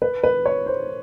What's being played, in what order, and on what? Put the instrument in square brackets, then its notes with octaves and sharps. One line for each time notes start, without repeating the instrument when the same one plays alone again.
[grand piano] B4
B4
C#5
C5